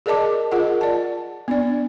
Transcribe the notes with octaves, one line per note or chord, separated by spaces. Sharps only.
G#4 A#4 D5 D#5 A5 D6
F4 G#4 A#4 D#5 F#5
D5 A5
B3 D4 D5